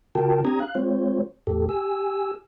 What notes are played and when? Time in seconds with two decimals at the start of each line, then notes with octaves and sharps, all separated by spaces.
0.15 C#3 F4 F#4 A#4 G5 A5
0.45 C4 D4 G4 A#5 D#6 G#6
0.60 F5 F#6
0.75 G#3 C4 F4 C5 C#5
1.47 E2 A2 G4 A4
1.69 G4 G#5 E6